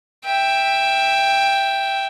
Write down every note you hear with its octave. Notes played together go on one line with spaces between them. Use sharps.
E5 G5